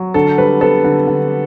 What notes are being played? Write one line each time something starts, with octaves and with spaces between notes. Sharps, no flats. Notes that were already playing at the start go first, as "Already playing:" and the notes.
Already playing: F#3
D3 A4
G3 B4
B3 A4
D3
D3